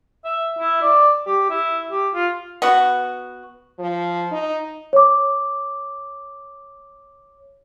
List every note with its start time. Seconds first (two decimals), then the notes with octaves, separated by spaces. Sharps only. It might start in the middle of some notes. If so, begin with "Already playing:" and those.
0.25 E5
0.59 E4
0.82 D5
1.26 G4
1.50 E4
1.90 G4
2.14 F4
2.62 B3 F#4
3.79 F3
4.32 D#4
4.93 C#5 D6